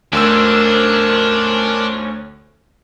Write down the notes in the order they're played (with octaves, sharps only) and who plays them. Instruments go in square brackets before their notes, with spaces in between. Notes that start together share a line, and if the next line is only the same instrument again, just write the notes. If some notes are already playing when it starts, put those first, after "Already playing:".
[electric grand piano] D2 E6 [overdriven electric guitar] C#4 C5 [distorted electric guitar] D4 [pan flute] A#4